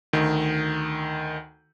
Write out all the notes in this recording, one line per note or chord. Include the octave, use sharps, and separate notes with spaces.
D2 D#3